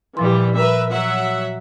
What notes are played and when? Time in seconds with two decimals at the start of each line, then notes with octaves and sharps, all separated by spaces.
0.17 A#2 E3 F3 G3 C6
0.56 A#4 B4 E5
0.91 F#3 E5 F#5